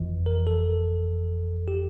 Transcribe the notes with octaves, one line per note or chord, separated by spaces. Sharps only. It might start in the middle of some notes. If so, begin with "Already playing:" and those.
Already playing: G1 F2 E3
A#4
A4
G4